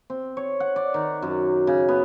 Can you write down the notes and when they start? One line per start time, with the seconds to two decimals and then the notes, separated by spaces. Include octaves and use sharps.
0.10 C4
0.37 C#5
0.60 F#5
0.76 D5
0.94 D#3
1.22 F#2
1.67 C#3
1.88 B3